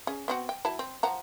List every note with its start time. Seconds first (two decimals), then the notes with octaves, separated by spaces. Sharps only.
0.07 C#4 G#4
0.28 B3 C4 F#4
0.49 G5
0.65 F#3 E4 A5
0.79 C4
1.03 F3 F#5 A#5